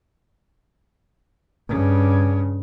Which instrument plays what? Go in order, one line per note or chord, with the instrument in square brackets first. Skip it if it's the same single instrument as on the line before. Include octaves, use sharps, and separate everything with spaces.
[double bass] G2 C#3